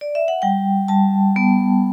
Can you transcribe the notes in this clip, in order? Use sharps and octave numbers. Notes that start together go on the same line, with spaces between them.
D5
E5
F#5
G3 G5
G3 A5
B3